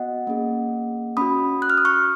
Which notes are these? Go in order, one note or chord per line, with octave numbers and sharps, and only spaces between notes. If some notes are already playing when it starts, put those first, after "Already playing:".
Already playing: B3 F#4 D#5 F#5
A#3 C#4 G#4
C#4 F#4 B5 D#6
F#6
F6
D#6
C#6 F6